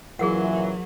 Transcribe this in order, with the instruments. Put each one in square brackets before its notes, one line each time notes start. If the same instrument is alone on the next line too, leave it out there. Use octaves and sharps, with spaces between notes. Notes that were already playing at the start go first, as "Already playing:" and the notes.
[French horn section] F#2 A#2 E3 [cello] F#3 [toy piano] G#4 A#4 F#5